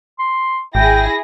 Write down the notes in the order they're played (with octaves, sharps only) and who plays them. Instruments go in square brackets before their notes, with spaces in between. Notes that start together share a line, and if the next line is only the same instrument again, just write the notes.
[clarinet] C6
[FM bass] G#1 [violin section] E4 G#4 A#6 [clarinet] G5